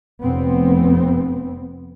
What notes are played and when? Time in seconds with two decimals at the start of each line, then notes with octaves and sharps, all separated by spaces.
0.23 F1 B3 C4